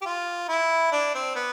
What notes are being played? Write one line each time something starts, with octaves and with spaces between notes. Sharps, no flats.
G4
F4
E4
D4
C4
B3